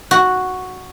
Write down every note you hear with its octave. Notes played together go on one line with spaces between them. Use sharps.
F#4